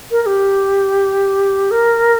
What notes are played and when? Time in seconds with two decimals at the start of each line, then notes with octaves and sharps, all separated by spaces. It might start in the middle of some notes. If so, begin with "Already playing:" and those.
0.11 A#4
0.22 A#4
0.26 G4
1.71 A#4